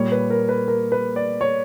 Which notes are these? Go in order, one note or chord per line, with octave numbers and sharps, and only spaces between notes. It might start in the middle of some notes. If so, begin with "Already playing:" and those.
Already playing: A#2 G3 A#3 C#5
B4
A#4
B4
A#4
B4
D5
C#5